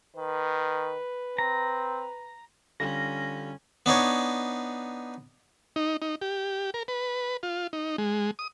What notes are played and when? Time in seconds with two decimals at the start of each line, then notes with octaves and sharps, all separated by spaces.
0.16 D#3 B4
1.39 C4 A#5
2.80 D3 G3 C#4 F4 A#6
3.86 B3 D4 D#4 C#5
5.76 D#4
6.02 D#4
6.21 G4
6.74 A#4
6.88 B4
7.43 F4
7.73 D#4
7.98 G#3
8.39 D#6